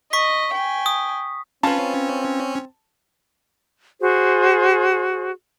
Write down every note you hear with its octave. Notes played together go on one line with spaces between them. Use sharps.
D#5 C#6 B6
G5 G#5
D#6
C4 C#4 F4 B4 A5
F#4 G#4 C5